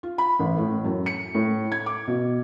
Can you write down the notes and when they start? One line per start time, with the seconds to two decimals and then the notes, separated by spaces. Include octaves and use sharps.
0.03 F4
0.18 B5
0.39 A1
0.58 A2
0.84 F#2
1.06 C#7
1.35 A2
1.72 G#6
1.86 D6
2.07 B2